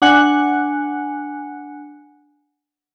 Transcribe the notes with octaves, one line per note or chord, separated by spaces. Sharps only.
D4 F#5 G#5 F#6 C#7